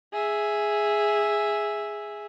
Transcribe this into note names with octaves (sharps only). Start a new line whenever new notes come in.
G#4 E5